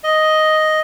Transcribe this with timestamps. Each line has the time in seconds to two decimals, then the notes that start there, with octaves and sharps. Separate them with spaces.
0.04 D#5